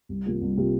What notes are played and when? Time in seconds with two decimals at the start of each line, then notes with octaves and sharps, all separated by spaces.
0.09 C2
0.25 C3 A#3 F4
0.41 C2
0.57 C3 A#3 F4